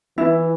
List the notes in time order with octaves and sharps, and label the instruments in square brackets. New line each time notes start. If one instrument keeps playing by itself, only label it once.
[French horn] E3 [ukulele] E4